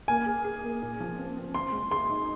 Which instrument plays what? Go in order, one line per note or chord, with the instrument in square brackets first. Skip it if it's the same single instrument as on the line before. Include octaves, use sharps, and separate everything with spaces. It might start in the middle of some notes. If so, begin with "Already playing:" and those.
[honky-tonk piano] A#3 [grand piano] G#5
[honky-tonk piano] G#4
G#4
A#3
A#2
F3
C4
C4
[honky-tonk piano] C4 [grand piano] C6
[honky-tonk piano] G#3
[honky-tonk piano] G#4 [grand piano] C6
[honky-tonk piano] D#4